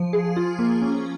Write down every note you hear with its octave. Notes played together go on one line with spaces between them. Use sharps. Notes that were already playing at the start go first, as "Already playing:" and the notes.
Already playing: F3
G#4
F4
A#3
C#4